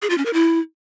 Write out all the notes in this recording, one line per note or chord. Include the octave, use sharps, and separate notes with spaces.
G#4
F4
C#4
A#4
E4